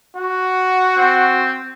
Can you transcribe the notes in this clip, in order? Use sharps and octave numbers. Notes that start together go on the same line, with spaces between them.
F#4 F#5
C4